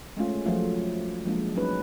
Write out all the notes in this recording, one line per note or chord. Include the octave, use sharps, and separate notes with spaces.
G#3 A3 C#4 F4
F3 F#3 A3 F4
F3 G#3 A#3 D4
F#3 C#4 D#4 B4